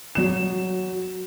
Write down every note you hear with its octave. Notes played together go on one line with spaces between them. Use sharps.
F#3 E7